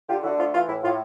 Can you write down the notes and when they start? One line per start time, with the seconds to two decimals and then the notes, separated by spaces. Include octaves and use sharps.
0.08 D3 F4 G4
0.23 D3 E4 F#4
0.38 A3 F4
0.53 E3 F4
0.68 A2 E4
0.83 A2 F4